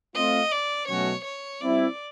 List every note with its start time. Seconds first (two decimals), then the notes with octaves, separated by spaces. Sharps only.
0.15 A3 C4 F4 D#5
0.52 D5
0.88 B2 F#3 A3 C#4 F#4 C#5
1.24 C#5
1.61 G3 C4 E4 D5